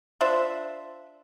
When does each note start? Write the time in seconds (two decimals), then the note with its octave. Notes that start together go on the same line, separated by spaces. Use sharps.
0.21 D4 F4 C5 E5